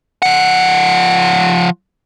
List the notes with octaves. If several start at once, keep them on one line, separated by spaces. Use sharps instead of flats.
F3 F#5